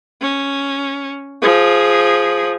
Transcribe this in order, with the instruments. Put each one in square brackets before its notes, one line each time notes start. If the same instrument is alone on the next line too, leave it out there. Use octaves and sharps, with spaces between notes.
[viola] C#4
F3 G#4